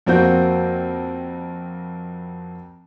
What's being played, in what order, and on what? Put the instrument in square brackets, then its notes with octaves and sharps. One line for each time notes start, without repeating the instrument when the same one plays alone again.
[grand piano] F2 A#3 C4 F#4 G6